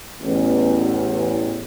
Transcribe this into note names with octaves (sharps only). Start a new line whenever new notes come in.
A1 E2